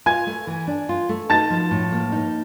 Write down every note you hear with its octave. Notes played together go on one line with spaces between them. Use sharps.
F4 G#5 G#6
A3
E3
D4
F4
A3
D#4 A5 A6
F3
A2
A#3
D#4